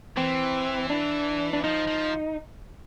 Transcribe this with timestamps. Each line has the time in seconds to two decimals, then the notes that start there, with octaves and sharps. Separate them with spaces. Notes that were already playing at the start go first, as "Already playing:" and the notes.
0.17 E3 C4
0.90 D4
1.53 D4
1.64 F3 D#4
1.87 F3